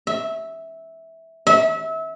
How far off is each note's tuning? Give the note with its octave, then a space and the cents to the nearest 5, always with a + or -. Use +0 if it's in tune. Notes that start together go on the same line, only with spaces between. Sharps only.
E5 -10
E5 -30